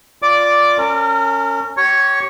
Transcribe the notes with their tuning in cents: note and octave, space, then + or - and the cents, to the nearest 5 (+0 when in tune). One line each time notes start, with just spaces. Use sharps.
F4 +0 D5 -5 D6 +0
C#4 +0 A#4 -35
G4 -40 C#5 +0 C#6 +0